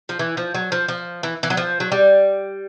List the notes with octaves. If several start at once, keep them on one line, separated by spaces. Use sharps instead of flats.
F3
E3
F3
F#3
F3
F3
E3
E3
F#3
F3
F#3
G3